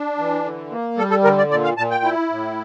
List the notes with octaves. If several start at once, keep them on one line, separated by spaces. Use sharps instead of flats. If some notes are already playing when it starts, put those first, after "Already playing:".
Already playing: D4
E3
D3
A#3
G3 A4
A4
D3 A#4
D5
A#2 D5
F5
A#2 A5
G5
E4
A2